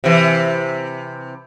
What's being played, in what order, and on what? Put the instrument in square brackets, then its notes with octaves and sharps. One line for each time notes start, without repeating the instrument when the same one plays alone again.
[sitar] C3 E3